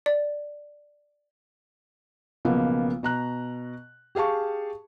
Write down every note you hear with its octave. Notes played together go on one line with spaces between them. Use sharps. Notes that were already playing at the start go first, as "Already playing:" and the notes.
D5
B1 C#3 F3 A#3 B3
B2 A#5 F#6
G4 G#4 F5 A5 C#6